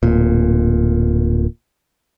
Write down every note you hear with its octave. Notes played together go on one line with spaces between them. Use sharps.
D1 A#2